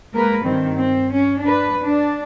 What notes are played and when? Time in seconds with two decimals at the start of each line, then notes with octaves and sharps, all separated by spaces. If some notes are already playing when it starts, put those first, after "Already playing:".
0.13 G#3 A#3 A#4 B4
0.43 G2 D#3 C4
0.76 C4
1.11 C#4
1.41 D4 B4
1.83 D4